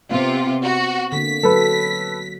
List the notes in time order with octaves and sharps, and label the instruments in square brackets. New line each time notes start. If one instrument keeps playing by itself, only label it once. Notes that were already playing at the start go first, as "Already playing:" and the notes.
[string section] C3 F4 [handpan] B3 C4
[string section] F#4
[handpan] D3 A#3 [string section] B6
[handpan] F#3 [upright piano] A4 B4